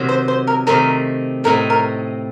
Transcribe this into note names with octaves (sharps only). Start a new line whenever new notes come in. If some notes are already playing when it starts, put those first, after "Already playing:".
Already playing: C3 D#3 F#3
C5
C5
A#4
C3 D#3 A3 C4 D#4 A#4
A2 A3 C4 D#4 A#4
A#4